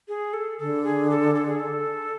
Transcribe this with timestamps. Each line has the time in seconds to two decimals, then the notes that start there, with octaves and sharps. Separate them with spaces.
0.08 G#4
0.33 A4
0.59 D3 A4
0.84 G#4
1.10 A4
1.35 A4
1.47 G#4
1.60 A4